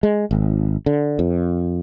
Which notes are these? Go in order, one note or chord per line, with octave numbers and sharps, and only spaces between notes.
G#3
G#1
D3
F2